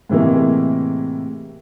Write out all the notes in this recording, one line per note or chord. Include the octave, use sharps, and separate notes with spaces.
A2 C3 E3 G#3 A#3